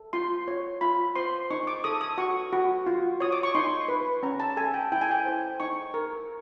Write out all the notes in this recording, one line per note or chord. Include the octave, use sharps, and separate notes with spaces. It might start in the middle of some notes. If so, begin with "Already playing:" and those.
Already playing: A4
F4 C6
C#5
F4 B5
C5 C6
D#4 C#6
D6
A4 D#6
D#6
F#4 C#6
F#4
F4
C#5 D#6
D6
C#6
D#4 C6
B4
C#4 A#5
A5
A4 G#5
G5
E4 G5
G#5
G5
C5
D#4 C#6
A#4